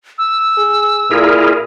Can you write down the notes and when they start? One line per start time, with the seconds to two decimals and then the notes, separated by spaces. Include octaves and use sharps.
0.18 E6
0.58 G#4
1.11 A#2 E4 G#4 A#4